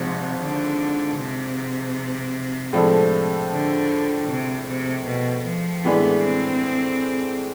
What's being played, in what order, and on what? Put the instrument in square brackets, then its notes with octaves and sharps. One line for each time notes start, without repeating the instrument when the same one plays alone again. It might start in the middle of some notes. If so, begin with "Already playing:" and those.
Already playing: [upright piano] G#1 G#2 F3 G#3 [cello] C3
[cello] D3
C3
[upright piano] A2 F3 G#3 D4 A4
[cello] D3
C3
C3
B2
F3
[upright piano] A2 E3 G#3 D4 G#4 [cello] B3
[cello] C4